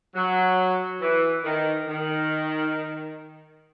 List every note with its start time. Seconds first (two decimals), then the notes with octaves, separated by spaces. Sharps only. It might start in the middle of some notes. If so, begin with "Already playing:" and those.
0.16 F#3
1.02 E3
1.44 D#3
1.87 D#3